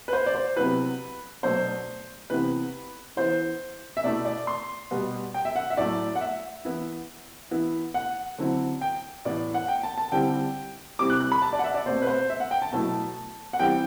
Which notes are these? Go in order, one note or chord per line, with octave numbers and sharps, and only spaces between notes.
B4
C5
D5
C5
C3 F#3 B3 E4 B4
B2 F#3 A3 D4 C5
C3 E3 B3 B4
E3 B3 E4 C5
E5
B2 A3 E4 D5
D5
C6
B2 G3 B3
G5
E5
F#5
E5
A2 F#3 A3 E4 D5
F#5
E5
E3 B3 E4
E3 B3 E4
F#5
D3 F#3 C4 E4
G5
A2 E3 B3 E4 D5
F#5
G5
A5
A5
D3 G3 C4 E4 G5
C3 G3 C4 E4 D6
F#6
F#6
B5
A5
D5
F#5
E5
D5
B2 A3 C4 C5
B4
C5
E5
F#5
G5
A5
B2 F#3 A3 E4 A5
F#5
E3 G3 C4 E4 G5